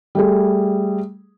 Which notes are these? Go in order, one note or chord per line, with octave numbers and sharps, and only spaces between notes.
G3 A3 G#4